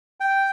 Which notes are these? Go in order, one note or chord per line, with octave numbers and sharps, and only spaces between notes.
G5